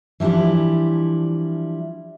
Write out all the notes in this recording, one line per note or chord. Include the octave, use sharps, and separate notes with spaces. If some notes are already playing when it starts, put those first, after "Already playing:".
E3 F3 G3 D4 E4